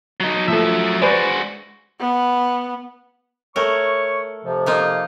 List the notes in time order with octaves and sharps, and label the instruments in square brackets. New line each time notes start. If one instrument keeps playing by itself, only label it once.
[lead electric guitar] F#3 D#4
[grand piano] F3 A3 [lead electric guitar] F#3 E5
[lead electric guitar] G#3 F#4 [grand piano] B4 C5 D5
[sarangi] B3
[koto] A3 A#4 [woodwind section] C#5 C#6
[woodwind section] F2 C3 F3
[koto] A#3 D#4 F4